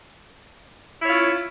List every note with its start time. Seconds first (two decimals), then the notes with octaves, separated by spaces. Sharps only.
1.01 E4
1.04 C#5
1.08 F4
1.11 C#4